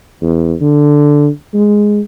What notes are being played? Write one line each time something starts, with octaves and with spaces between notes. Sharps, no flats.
E2
D3
G#3